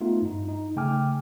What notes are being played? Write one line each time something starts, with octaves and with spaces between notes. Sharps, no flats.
A3 B3 D#4 F4
G2 D#4
D#4
C#3 A3 G5 G#5 D6 F6